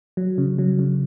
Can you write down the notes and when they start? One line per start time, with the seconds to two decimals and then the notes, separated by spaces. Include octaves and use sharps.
0.17 F#3
0.38 C#3
0.59 F#3
0.79 C#3